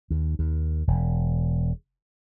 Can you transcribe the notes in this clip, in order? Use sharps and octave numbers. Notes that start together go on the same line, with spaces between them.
D#2
D#2
E1